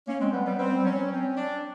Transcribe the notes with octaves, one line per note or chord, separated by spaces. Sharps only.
A#3 C#4
G#3 C4
G3 B3
G3 B3
G3 C4
G3
F#3 C#4
C4 C#4
D4